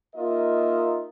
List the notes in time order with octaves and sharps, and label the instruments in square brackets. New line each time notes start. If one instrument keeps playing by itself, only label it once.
[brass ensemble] A#3 D#4 F4 A#4 D#5 E5